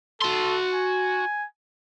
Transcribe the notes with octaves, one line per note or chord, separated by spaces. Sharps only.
F#4 A4 C6
G#5